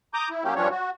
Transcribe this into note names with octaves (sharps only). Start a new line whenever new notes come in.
A#5 D6 D#6 G6
E4
F#3 A#3 C#4 G4
G2 F3 G3 C#4 D4 C#5
F#4